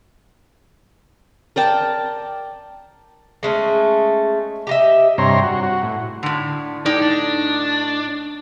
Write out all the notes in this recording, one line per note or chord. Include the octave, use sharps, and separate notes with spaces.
A#4 D5 G5 A5
G#3 A3 C#4
G4 D#5 E5
G2 C3 C#5 A#5 C6
F#4
F#4
A2
A2 D3
A2 D#4 G4 D5
D4